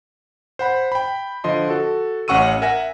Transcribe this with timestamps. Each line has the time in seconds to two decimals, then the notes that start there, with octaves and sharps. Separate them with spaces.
0.59 C5 F#5 B5
0.92 G5 B5
1.44 D3 F3 D#5 C6
1.69 F#4 A4
2.28 A1 C#4 F#5 C#6 E6 D#7
2.62 A#4 E5 F#5 G#5 A#6